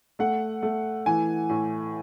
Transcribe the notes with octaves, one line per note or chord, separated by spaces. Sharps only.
A3 F#5
A3
E3 G#5
A2